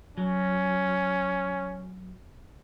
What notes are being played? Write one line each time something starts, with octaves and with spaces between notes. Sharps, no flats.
F#3 C#4